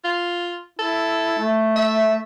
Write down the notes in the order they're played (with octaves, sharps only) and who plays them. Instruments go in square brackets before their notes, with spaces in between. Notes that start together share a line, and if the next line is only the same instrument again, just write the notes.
[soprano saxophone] F4
[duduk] E4 [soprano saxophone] A4
[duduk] A3
[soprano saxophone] E5